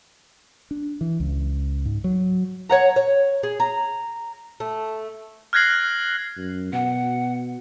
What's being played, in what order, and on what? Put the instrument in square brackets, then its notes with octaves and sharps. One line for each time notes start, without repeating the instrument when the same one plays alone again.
[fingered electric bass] D4
E3
C#2
G#2
F#3
[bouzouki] C#5 F#5 A#5
C#5
G#4
A#5
A3
[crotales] F6 F#6 G#6 A#6 C7 F#7
[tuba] F#2
[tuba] B2 [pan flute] F#5